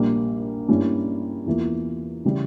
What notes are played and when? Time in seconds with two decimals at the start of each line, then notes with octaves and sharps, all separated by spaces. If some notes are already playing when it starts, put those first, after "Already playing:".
Already playing: A#1 A#2 G3 A#3
0.68 G2 G3 A#3 C#4 E4
1.46 E2 E3 A#3 F4
2.25 C#3 E3 G3